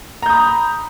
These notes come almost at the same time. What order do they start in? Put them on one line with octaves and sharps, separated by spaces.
A#5 G6 D#6 B5